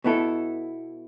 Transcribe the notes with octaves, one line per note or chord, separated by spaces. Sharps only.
B2 B3 E4 A4